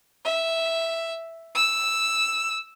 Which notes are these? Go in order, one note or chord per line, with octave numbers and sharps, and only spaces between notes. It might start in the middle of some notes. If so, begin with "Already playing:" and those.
E5
E6